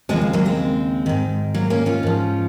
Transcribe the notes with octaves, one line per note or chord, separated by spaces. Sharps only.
D#2 C#3 F3 G#3 C4
G#3
F#3 A#3
G#3 C4
G#2 D#3
F#3 A#3
A#3 C#4
C#4 F4
G#2 F3